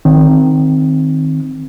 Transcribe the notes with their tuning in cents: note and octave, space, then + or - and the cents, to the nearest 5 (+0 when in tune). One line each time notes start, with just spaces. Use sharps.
D#3 +0 C4 +0